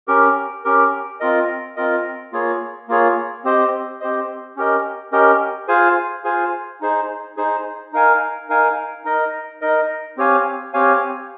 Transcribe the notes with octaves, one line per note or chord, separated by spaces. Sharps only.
C#4 G4 A#4
C#4 G4 A#4
C4 F4 A#4 D#5
C4 F4 A#4 D#5
A#3 F4 G#4 C#5
A#3 F4 G#4 C#5
C4 G4 C5 D#5
C4 G4 C5 D#5
C#4 G4 A#4 D#5
C#4 G4 A#4 D#5
F4 G#4 C5 F5 G#5
F4 G#4 C5 F5 G#5
D#4 G#4 C5
D#4 G#4 C5
D#4 A#4 F5 G#5
D#4 A#4 F5 G#5
D#4 A#4 D#5
D#4 A#4 D#5
C4 G4 C#5 F5 G#5
C4 G4 C#5 F5 G#5